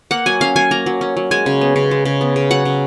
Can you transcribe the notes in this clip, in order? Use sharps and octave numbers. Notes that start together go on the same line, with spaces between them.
A#3 F#5
F#3 G#5
C#4 F5
F#3 G#5
A#3 A#5
F#3
C#4
F#3
G#3 G#5
C#3
B3
C#3
G#3
C#3
B3
C#3
F#3 F#5
C#3